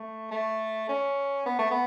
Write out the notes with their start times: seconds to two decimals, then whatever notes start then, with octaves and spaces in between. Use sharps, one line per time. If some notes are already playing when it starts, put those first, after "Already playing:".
Already playing: A3
0.31 A3
0.89 C#4
1.46 B3
1.59 A3
1.71 B3